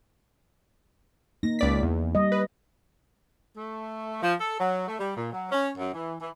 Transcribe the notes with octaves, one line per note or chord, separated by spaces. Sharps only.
A#3 D#4 A#6
C#2 D5 B6
E2
G3 D#5
B4
A3
F3
A4
F#3
A3
G3
A#2
F#3
C#4
F#2
E3
E3